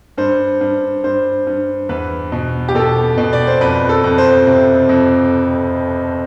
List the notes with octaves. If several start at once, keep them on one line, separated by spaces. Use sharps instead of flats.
G2 C5
G2
G2 C5
G2
E2 B4
B2
G4
B2 A4
B2
D5
C5
F2 B4
A4
F2
C5
C3
F2